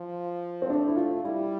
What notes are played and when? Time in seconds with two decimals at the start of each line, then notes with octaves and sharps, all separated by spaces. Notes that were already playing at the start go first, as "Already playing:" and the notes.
Already playing: F3
0.62 C4
0.69 A3 D4
0.87 E4
0.96 F4
1.24 G3 E4